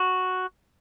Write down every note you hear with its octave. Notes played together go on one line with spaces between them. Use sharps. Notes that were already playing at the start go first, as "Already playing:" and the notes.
Already playing: F#4